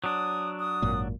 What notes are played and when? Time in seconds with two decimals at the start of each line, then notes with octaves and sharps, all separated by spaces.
0.04 F#3 D4 D#6
0.60 D#6
0.82 G#1 F#2 A#2